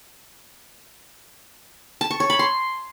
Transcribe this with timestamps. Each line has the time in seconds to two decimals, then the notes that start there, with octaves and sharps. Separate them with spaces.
2.01 A5
2.11 C#6
2.20 C#5
2.30 B5
2.39 C6